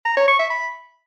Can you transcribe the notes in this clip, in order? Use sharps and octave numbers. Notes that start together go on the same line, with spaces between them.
A#5
C#5
C#6
E5
B5